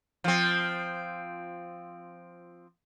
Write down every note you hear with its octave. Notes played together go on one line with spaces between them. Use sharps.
F3 C4